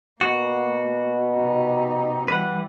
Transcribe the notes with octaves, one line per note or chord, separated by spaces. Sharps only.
B2 A#3 F#4
C3 D#4
E3 G3 B4 F#5